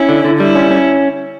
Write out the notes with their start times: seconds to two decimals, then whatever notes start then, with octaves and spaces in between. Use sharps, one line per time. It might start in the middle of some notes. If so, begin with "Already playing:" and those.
Already playing: C#4 E4
0.09 D3
0.24 D3
0.39 G3 E4
0.55 C#4
0.71 C#4